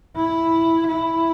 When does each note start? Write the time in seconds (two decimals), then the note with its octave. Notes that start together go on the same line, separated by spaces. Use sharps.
0.16 E4
0.87 E4